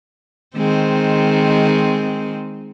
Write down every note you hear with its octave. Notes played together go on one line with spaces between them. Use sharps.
D#3 G#3 C4